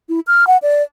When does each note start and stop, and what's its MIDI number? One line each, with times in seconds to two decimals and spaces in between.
0.09 0.20 64
0.27 0.47 89
0.47 0.57 78
0.62 0.82 74